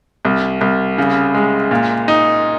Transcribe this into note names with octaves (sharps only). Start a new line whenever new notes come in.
C2
C2
C#3
G#3
A#2
D#4